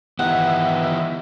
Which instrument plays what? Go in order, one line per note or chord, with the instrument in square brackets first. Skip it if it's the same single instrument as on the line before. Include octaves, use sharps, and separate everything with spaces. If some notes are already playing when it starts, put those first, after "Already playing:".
[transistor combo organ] D#3 E3 [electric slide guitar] B3 G4 [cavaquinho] F#5